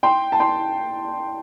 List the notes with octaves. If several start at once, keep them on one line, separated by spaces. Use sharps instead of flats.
G5 C6
A5
G5 C6